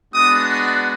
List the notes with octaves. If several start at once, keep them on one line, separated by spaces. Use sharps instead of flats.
G#3 B3 D4 F#4 D#6